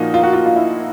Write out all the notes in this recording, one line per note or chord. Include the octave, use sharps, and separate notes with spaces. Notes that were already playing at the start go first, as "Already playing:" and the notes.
Already playing: A#2 F3 A#3 D#4 F#4
F4
F#4
F4
F4
E4